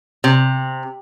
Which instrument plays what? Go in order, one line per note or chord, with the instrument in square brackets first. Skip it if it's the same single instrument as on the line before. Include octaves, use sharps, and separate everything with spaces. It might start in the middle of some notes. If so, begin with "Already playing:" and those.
[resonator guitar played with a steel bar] C3